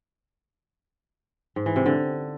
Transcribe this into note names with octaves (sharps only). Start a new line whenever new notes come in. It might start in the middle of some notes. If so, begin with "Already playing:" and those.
G#2
E3
C3
D3